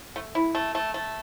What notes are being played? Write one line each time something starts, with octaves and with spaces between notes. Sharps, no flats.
A3
E4
A3
A3
A3